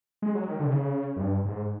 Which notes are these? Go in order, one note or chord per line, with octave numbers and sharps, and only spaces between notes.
G#3
F#3
D#3
D3
C3
C#3
F#2
G2
G#2